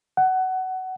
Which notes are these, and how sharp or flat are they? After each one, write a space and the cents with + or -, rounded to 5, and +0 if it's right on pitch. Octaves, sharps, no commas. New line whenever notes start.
F#5 +20